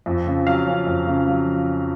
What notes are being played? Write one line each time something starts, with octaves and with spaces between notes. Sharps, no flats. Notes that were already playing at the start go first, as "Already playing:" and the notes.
F2
C#3
F#3 F5
C#4
F2
C#3
F#3